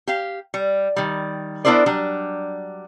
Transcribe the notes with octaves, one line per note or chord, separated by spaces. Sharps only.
G4 F5
G3
D#3 G3
B3 D4 E4 A#4 C5 D5
F#3 G3 D4